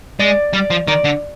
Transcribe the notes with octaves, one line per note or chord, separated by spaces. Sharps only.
G#3 D5
G3 D5
F3
D#3 D5
D3